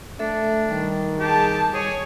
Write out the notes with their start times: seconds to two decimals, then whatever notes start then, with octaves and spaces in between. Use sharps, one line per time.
0.19 A3 D4 A4 E5
0.71 D#3 G3
1.19 G4 G#4 A5
1.74 G#4 C#5